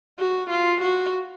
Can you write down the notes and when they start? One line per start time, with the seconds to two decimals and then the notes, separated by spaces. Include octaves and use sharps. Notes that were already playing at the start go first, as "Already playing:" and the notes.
0.19 F#4
0.50 F4
0.82 F#4